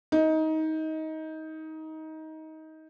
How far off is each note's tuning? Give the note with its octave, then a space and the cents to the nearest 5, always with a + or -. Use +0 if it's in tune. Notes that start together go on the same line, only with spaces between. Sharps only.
D#4 +20